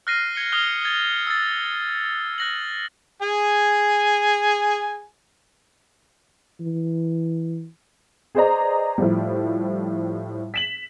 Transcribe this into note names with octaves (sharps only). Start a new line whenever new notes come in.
F6 F#6 A#6 C7 D#7
G#6 C#7 G7
D#6 F6 F#6 G7
G#6 A6
E6 A6
F#6 A#6 F#7
G#4 G#5
E3
G#4 B4 C5 D5 D#5 A#5
A2 F3 G3
B6 E7 F#7